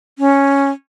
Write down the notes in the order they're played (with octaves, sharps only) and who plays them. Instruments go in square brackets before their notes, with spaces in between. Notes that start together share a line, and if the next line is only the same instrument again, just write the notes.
[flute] C#4